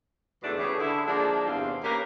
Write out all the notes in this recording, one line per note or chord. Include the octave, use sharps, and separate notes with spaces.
E2 G#2 B2 D3 A3 D4
A2 C#3 E3 G4 G#4
D3 E4
F3 G#3 A#3 D4
E2 G2 C3 D#3 C4 F5
A#3 C#4 G4 A#4 B4 F5